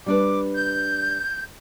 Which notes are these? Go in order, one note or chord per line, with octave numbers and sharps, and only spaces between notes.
G3 D4 B4 D6
G6